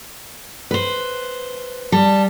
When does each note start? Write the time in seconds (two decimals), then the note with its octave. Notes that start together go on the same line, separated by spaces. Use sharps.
0.71 B4 C5
1.92 G3 A5